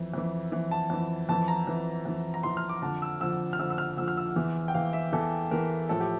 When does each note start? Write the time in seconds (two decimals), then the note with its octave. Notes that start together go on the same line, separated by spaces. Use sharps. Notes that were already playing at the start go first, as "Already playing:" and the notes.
Already playing: F2 E3
0.14 F2 E3
0.52 F2 E3
0.71 A5
0.90 F2 E3
1.29 F2 E3 A5
1.48 A#5
1.67 F2 E3
2.05 F2 E3
2.34 A#5
2.43 F2 E3 C6
2.57 F6
2.69 D6
2.82 F2 D3 F3 A5
3.02 E6
3.21 F2 D3 F3 E6
3.53 F6
3.59 F2 D3 F3 E6
3.70 E6
3.78 F6
3.97 F2 D3 F3 E6
4.08 F6
4.17 E6
4.36 E2 E3
4.68 G5
4.74 E2 E3 F5
4.93 E5
5.12 E2 E3 A4
5.51 E2 E3 A#4
5.89 A2 F3 A4
6.00 G4